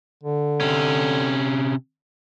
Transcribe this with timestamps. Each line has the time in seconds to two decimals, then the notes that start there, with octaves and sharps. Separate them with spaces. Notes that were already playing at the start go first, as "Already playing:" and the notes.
0.23 D3
0.61 C3 C#4